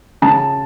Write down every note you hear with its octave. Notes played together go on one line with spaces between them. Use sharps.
C#3 A5